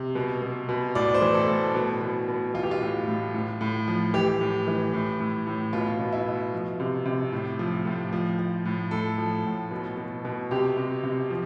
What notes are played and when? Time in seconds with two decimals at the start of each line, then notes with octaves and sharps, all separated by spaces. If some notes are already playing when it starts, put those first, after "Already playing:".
Already playing: C3
0.15 B2
0.42 B2
0.69 B2
0.95 A2 D5
1.14 C5
1.21 E3
1.34 A4
1.48 A2
1.75 B2
2.01 B2
2.29 B2
2.54 E3 F4
2.63 G4
2.71 F4
2.81 A2
3.08 A2
3.34 A2
3.61 A2
3.88 F3
4.14 E3 G4
4.41 A2
4.67 E3
4.93 A2
5.20 A2
5.47 A2
5.73 B2 F4
6.00 B2
6.13 E4
6.27 B2
6.52 F3
6.80 C3
7.05 C3
7.32 A2
7.59 F3
7.85 A2
8.13 F3
8.39 F3
8.65 A2
8.91 A2 A4
9.18 F3
9.45 A2
9.71 B2
9.97 B2
10.25 B2
10.51 C3 G4
10.77 C3
11.03 C3
11.30 F3